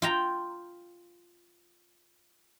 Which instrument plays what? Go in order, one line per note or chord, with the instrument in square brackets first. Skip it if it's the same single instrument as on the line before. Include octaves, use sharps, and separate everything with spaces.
[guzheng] F4 G5 A#5